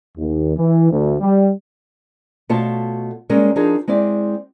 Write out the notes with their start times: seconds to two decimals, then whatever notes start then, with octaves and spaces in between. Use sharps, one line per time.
0.18 D#2
0.56 E3
0.91 D2
1.21 G3
2.49 B2 A3 F4 C#5 A5
3.29 G3 G#3 A#3 C#4 A#4 C#5
3.56 F3 D4 D#4 G#4 A#4
3.88 G#3 C4 E4 D5